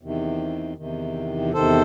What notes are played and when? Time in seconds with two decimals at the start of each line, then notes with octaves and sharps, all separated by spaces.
0.01 E2 C3 D#3
0.78 E2 C3 D#3
1.53 E2 C3 D#3 A4 C5